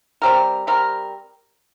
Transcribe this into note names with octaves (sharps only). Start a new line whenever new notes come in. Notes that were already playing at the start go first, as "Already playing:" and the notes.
G3 C4 G4 A#4
G3 C4 G4 A#4